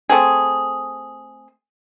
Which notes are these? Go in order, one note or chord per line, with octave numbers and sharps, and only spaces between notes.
A3 C4 G#4